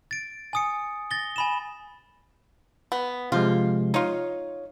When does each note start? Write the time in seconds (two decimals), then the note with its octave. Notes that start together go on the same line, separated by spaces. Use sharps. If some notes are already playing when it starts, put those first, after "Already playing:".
0.11 A6 D7
0.53 G#5 D#6 C#7
1.11 A6 A#6 G7
1.36 G#5 B5 E7
2.92 B3
3.32 C3 F3 G#3 F4
3.94 D#4 F4 C#5